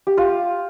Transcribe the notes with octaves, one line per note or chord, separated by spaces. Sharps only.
G4
F4